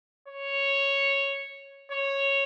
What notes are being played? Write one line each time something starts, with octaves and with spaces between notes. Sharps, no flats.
C#5
C#5